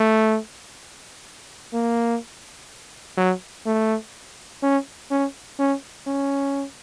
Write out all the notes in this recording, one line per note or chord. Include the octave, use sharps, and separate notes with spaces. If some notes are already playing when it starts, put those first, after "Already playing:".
Already playing: A3
A#3
F#3
A3
C#4
C#4
C#4
C#4